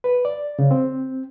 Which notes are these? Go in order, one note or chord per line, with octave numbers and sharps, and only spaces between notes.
B4
D5
C#3
C4